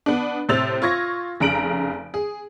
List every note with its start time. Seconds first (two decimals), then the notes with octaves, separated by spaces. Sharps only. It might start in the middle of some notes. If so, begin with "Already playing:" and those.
0.06 B3 D4
0.49 A2 C3 C5 E6 A6 F7
0.82 F4 C#6 G#6 A#6
1.40 F1 C#3 A#5 D7 F#7
2.14 G#4